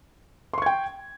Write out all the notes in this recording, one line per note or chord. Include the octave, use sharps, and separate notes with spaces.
G5 C6 C#6 G#6